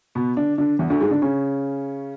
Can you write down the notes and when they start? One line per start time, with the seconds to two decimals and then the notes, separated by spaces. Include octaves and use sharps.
0.15 B2 B3
0.37 D3 D4
0.58 D3 D4
0.79 E2 E3
0.90 D2 D3
1.01 G#2 G#3
1.11 D3 D4
1.22 C#3 C#4